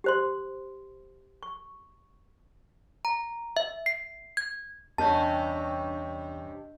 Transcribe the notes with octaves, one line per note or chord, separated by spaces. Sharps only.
G4 C5 C6
C#6
A#5
E5
C7
G#6
E2 G2 C3 C#4 D4 D#5 A5 G6